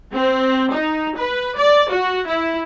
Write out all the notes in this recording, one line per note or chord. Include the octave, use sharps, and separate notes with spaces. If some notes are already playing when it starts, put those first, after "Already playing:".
C4
D#4
B4
D5
F#4
E4